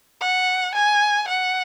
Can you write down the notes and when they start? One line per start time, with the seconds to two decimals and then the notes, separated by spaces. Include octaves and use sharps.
0.21 F#5
0.75 G#5
1.28 F#5